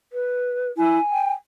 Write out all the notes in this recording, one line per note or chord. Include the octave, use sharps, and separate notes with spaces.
B4
E4 G#5
G5